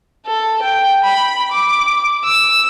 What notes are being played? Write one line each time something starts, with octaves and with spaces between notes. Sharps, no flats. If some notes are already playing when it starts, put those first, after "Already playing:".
A4
G5
B5
D6
E6